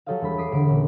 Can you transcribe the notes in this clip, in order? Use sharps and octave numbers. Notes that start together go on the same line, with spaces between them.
F#3 G4 A4 C#5 D#5 F5
E1 G3 B5
D6 D#6 B6 C7 D7
E1 D3 D7
A#2 C#4